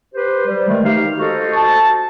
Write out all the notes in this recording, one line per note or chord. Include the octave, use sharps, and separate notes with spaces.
G4 B4 C5
G3
D#3 G#3 A3
D#4 G4 F5
F#4 A4 C5 D#5
A5